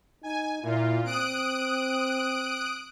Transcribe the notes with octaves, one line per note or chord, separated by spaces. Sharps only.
D#4 G#5
A#2 E4 F4
C4 D#6 F#6 D7